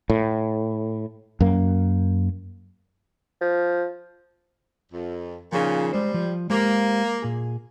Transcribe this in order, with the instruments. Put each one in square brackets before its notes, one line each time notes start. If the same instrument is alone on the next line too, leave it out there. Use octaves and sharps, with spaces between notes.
[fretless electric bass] A2
F#2 A#3
[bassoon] F3
[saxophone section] F2
[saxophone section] A#2 C#3 [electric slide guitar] F3 D#4
[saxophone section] G3 [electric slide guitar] G#3 C5
[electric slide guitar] F3
[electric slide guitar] G#3 G4 C5 [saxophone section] A#3
[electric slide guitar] A#2 G#4